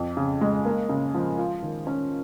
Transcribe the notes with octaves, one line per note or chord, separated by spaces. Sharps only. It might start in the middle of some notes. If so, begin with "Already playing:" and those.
Already playing: F2
C#3
G#3
A#3
C#3
F3
F4
D#3
C#4